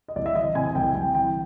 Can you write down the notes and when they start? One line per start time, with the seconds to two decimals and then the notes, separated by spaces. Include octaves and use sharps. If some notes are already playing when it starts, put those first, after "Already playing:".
0.08 D#5
0.16 C2 D5
0.26 E5
0.35 E3 D#5
0.55 C3 G#5
0.67 G#5
0.75 C2 G5
0.95 C2 G5
1.15 E3 G5